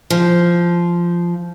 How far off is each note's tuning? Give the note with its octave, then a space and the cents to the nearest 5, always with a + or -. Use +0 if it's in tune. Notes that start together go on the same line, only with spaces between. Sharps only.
F3 -10